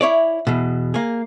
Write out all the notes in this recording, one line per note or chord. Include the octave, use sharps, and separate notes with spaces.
E4 C#5 D5
E2 B2
A#3 G#4